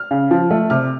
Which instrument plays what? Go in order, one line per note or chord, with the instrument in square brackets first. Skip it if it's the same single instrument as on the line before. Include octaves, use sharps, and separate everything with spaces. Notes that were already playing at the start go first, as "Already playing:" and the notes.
Already playing: [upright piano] F6
C#3
F3
A3
C3 F6